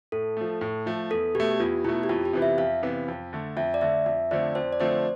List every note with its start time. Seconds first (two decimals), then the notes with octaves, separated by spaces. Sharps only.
0.12 A2 A4
0.37 F3 A3
0.61 A2
0.86 F3 A3
1.10 E2 A4
1.35 B2 A3 G4
1.51 G4
1.60 E2 F4
1.84 B2 A3 E4
2.03 G4
2.09 F2 F4
2.25 G4
2.33 C3 E3 B3
2.42 E5
2.58 F2 F5
2.83 C3 E3 B3
3.08 F2
3.33 D3 A3
3.57 F2 E5
3.74 D5
3.81 D3 A3 E5
4.06 F2 E5
4.31 D3 F3 A3 C4 D5
4.55 F2 C5
4.73 D5
4.80 D3 F3 A3 C4 C5